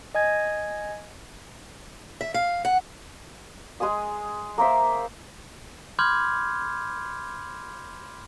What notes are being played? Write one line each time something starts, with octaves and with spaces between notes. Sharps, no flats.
D#5 G#5 G#6
E5
F5
F#5
G#3 G#4 G#5 D#6
A#3 A#4 C5 E5
B5 C6 D6 F6 G6 G#6